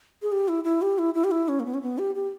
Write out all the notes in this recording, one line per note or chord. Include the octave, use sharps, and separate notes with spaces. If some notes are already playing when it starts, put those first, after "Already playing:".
G#4
G4
E4
E4
G4
E4
E4
G4
E4
C#4
A#3
B3
C#4
B3
G4
G4